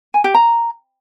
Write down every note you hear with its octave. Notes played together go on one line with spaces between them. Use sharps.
G#5
G4
A#5